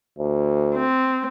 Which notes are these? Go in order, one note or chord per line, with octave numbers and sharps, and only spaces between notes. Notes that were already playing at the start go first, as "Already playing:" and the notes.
D2
C4